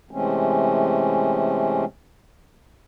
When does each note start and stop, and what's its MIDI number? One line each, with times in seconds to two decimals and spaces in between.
0.11 1.85 48
0.11 1.85 52
0.11 1.85 56
0.11 1.85 57
0.11 1.85 60
0.11 1.85 61